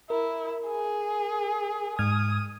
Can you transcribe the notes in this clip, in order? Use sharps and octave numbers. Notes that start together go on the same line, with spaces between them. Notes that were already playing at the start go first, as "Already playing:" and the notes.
E4 A#4
G#4
G#2 D#6 F6 G#6